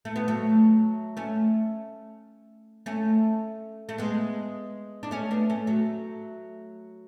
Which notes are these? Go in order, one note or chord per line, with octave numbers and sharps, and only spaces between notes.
A3
B3
F#3 A3
A3 C#4
A3 C#4
A3
G#3 B3
D4
A3 C#4
B3 D4
A3 C#4
F#3 A3